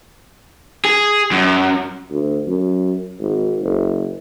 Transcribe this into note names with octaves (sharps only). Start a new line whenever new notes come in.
G#4
F#2
D2
F#2
G#1
F#1